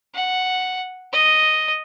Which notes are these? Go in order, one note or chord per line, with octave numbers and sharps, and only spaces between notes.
F#5
D#5